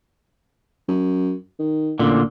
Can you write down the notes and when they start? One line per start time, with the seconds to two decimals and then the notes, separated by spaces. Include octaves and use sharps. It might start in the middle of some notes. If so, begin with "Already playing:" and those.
0.88 F#2
1.59 D#3
1.99 A1 A#2 D3